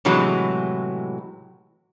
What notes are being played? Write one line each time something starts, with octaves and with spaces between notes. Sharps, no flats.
A2 C3 E3 F#3 G#3